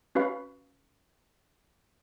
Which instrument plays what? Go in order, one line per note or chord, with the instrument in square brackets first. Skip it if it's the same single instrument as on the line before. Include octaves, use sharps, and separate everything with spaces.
[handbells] C#4 F#4 B4 F5 B5